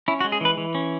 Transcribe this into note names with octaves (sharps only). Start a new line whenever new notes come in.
C#4 E4
F#4
G#3
G#4
E3 B4
E3
C#4